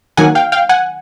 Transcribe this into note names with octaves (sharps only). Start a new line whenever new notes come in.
D#3 F#3 A#3 F#5 G#5
F5 G5
F5 G5
F#5 G#5